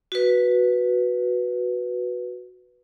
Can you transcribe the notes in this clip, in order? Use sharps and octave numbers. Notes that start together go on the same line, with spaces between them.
F#4 B4